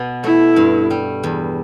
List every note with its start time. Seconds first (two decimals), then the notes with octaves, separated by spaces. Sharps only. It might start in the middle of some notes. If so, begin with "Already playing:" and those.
Already playing: B2 B3
0.23 A3 E4
0.56 G2
0.91 G3
1.24 E2